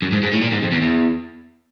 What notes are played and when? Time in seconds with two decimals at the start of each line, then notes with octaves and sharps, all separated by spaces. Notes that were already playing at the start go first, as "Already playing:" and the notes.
0.02 F#2
0.13 G#2
0.23 G#2
0.33 A2
0.42 A#2
0.53 G#2
0.63 F2
0.72 E2
0.83 E2